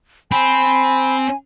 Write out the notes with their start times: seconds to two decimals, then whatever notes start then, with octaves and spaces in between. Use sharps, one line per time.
0.31 C4 G#5 B5